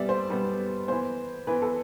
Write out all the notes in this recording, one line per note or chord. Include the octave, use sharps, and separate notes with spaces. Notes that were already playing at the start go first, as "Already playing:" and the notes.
Already playing: B2 G3 B3 D5 E5
C5
B2 G3 B3
E3 B3 C5
E3 B3 B4
A4